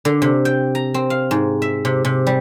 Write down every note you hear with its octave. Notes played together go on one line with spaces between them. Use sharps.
D3
C3
G5
A#5
C4
F5
G#2
E5
C3
C3
G3